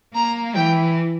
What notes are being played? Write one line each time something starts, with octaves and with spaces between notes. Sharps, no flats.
A#3 A#5
E3 G5